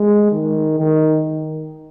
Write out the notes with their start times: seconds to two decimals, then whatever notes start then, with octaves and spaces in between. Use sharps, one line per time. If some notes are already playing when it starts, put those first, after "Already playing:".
Already playing: G#3
0.31 D#3
0.78 D#3